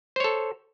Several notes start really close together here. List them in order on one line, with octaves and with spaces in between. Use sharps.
C5 C#5 A4